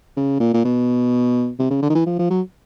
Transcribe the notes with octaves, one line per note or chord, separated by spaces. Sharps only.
C#3
A#2
A#2
B2
C3
C#3
D3
D#3
E3
F3
F3
F#3